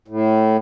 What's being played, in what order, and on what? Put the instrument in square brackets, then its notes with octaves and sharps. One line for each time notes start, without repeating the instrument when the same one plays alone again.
[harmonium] A2